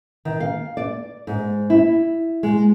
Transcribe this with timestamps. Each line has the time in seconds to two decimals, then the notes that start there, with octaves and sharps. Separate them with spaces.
0.25 D#3
0.40 F5
0.77 D5
1.27 G#2
1.70 E4
2.43 G#3